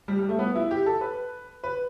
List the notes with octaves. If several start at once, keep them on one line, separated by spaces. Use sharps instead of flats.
G3
G3
A3
B3
E4
G4
A4
B4
B4